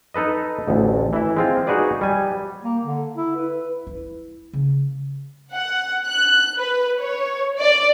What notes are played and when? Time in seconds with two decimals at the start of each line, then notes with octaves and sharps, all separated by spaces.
0.14 D#4 A4 B4 D#5
0.68 A1 D2
1.13 E3 E4
1.37 G#3 C4 F4
1.67 D#4 F#4 G#4 B4 D5
2.01 G3 G#5
2.63 A#3
2.82 D3
3.17 E4
3.36 B4
3.87 E4
4.53 C#3
5.54 F#5
6.06 F#6
6.57 B4
7.00 C#5
7.60 D5